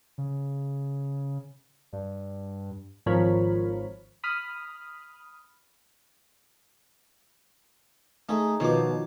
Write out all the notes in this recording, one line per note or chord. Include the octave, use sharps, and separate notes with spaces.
C#3
G2
G#1 F3 A#4 C#5 B5
B5 D#6 F6
A3 D#4 G#4
B2 D#3 F3 C#5 D6